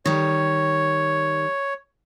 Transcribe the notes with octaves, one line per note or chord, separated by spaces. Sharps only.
D#3 G3 C#5